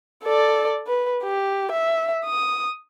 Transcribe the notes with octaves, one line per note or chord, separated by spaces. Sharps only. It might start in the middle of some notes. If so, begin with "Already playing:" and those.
A4 D5
B4
G4
E5
D#6